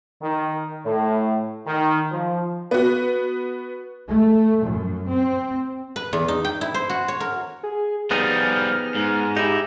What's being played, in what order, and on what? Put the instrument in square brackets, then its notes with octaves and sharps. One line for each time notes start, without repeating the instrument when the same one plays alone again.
[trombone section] D#3
A2
D#3
F3
[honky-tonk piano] B3 F#4
[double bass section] A3
F#2
C4
[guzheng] B4
E2
D#4
G5
E4
C5
F#4
C#5
A#4
[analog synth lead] G#4
[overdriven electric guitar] F3 G3 [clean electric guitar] B3 D#4 G#4 [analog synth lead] F6
[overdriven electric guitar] G#2
[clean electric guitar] D#4 E4 [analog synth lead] G4